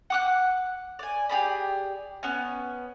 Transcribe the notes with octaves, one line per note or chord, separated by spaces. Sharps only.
F#5 D6 F#6
D5 G#5
G4 G#4 D5 B5
B3 C#4